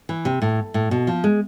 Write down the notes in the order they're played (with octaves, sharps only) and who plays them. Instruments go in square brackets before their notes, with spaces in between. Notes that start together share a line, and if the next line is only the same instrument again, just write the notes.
[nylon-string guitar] E3
C3
A2
A2
B2
F3
G#3